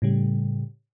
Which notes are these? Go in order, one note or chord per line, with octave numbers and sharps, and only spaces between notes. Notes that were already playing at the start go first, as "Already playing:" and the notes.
A2 C#3 G3